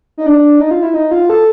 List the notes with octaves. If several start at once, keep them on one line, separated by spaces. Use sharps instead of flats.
D#4
D4
D#4
F4
E4
D#4
F4
A4